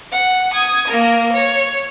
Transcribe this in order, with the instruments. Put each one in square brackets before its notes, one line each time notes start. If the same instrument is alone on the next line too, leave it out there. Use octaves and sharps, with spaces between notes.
[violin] F#5
D#6 G#6
A#3 A#4
C#5